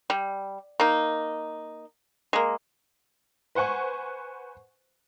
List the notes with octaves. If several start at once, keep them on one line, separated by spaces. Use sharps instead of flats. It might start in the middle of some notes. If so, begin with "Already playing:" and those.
G3
A#3 D#4
G#3 A#3
B4 C5 F#5 G#5 C#6